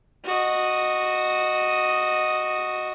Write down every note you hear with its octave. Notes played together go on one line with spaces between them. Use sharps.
F#4 D#5